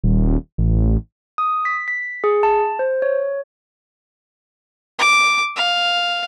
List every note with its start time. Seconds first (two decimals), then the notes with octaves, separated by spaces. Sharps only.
0.04 D#1
0.58 A1
1.38 D#6
1.65 B6
1.88 B6
2.24 G#4
2.43 A5
2.79 C5
3.02 C#5
4.99 D6
5.56 F5